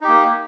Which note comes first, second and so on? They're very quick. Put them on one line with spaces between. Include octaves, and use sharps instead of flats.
D#4 G4 A#3